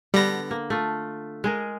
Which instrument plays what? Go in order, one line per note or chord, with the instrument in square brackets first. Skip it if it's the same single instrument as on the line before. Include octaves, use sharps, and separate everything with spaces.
[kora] D3 B3 [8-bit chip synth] G3 A#6
[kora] A#3
A3 F4
G#3 G#4 A#4